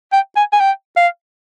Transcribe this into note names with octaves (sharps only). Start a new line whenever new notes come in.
G5
G#5
G#5
G5
F5